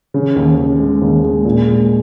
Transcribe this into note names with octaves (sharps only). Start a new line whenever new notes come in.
C#3
D#2
C#3
G#3
D#2
G#3
A#2
G#3